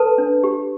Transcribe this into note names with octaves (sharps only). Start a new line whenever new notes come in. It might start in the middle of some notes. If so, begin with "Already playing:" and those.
Already playing: A4 B4 A5
D4
G4